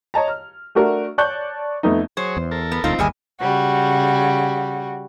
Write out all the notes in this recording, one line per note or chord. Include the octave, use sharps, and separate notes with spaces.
C#5 D#5 A5 A#5
F6
A3 D4 F#4 A#4
C#5 D5 A5 C#6 F#6 G6
F2 A3 B3 D#4
F#3 G#4 C5 C#5
E2
A4 A#4
B3
E1 D2 C4 D#4 F4
G1 D#2 G3 G#3 D#5 E5 G#5
C#3 G3 F#4